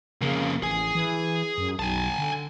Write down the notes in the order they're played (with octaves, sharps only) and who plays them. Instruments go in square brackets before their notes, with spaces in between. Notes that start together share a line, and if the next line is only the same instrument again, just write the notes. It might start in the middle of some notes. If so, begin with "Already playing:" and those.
[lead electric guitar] F2 A#3 [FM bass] C#3
[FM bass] A1 [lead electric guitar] G#4 G#5
[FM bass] E3
F#2
[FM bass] B1 [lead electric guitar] G#5 A5
[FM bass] D3